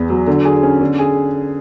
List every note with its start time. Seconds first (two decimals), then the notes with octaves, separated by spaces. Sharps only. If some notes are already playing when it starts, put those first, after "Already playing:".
Already playing: E2 B3
0.10 F#3
0.27 D3
0.45 G#4
0.63 C#4
0.81 D3
0.99 G#4